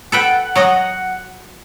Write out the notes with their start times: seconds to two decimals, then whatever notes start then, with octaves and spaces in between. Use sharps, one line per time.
0.12 A4 B4 F#5 G5
0.56 F#3 F#4 D#5